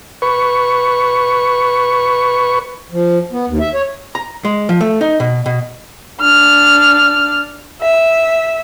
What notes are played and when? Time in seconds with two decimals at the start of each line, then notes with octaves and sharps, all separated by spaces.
0.22 B4 C#6
2.92 F3
3.32 B3
3.48 D#2
3.60 E5
3.74 C#5
4.15 A#5
4.45 G#3
4.69 F3
4.81 A3
5.01 D#4
5.20 B2
5.46 B2
6.21 D4 F6
7.82 E5